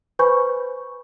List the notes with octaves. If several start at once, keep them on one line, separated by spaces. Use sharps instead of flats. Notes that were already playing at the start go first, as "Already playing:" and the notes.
B4 C5 G#5 B5 C#6 G6